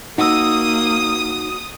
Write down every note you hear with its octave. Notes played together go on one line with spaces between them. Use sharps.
A#3 D#4 F#4 D#6 E6